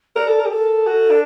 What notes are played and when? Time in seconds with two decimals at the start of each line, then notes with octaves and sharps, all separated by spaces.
0.16 A#4 D5
0.27 A4
0.39 A#4
0.46 G4
0.52 A4 A#4
0.86 F#4 A4
1.10 D4